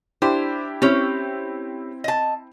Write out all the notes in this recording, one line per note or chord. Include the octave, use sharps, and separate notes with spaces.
D4 E4 G4 C5
C4 C#4 E4 G4
D#5 A5